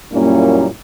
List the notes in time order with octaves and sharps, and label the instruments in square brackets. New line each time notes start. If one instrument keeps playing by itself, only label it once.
[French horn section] F#2 A#2 G3 A#3 C#4 E4